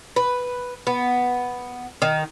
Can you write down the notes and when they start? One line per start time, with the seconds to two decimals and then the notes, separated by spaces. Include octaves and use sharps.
0.16 B4
0.87 B3
2.02 D#3